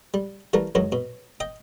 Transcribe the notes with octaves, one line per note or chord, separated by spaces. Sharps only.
G3
E3 G3 A3 A#4
C#2 F#2 D#3 F#3
B2
D#5 G5